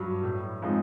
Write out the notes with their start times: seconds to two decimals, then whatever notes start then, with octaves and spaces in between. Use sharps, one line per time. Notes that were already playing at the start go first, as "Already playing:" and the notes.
Already playing: G2 F#3
0.23 A2
0.62 F3 G#3 C4 D#4